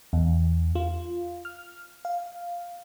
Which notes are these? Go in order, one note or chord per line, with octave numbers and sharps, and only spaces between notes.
E2
F4
F6
F5